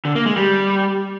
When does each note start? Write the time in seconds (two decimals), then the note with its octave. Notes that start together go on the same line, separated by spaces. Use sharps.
0.05 D3
0.15 A#3
0.26 G#3
0.37 G3